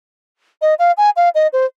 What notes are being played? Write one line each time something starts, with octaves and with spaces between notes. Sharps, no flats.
D#5
F5
G#5
F5
D#5
C5